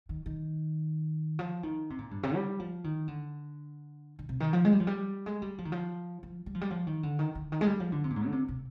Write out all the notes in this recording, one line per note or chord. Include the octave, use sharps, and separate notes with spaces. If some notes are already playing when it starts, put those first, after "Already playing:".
D#3
D#3
F3
D#3
C3
A#2
G2
C3
G3
F3
D#3
D3
D3
C3
D#3
F3
G#3
G3
F3
G3
G#3
G3
F3
D#3
F3
F3
G3
F3
G3
F3
D#3
D3
D#3
D3
D#3
G#3
G3
F3
D3
C3
A#2
G#2
D3
C3
C3